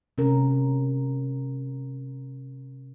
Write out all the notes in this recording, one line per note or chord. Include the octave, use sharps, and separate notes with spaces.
C3 C#4 A#4